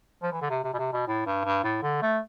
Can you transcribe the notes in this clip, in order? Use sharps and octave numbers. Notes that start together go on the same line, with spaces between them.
F3
E3
D3
C3
C3
B2
C3
B2
A2
G2
G2
A2
D3
A3